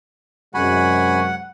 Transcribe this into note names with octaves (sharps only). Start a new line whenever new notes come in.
F#2 C3 G#3 F#4 F#5 G#5 B5